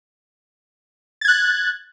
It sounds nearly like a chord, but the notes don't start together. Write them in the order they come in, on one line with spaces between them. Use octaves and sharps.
A6 G#6 F#6